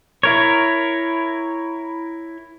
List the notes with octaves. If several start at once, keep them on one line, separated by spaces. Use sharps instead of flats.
E4 A#4 C#5